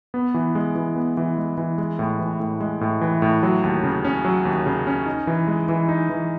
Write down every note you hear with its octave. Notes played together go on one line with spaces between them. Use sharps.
B3
E3
G#3
E3
B3
E3
G#3
E3
G#3
A2
E3
A2
G#3
A2
E3
A2
F#3
D#2
C#3
C#4
F#3
D#2
C#3
C#4
D#4
E3
G#3
E3
D#4
E3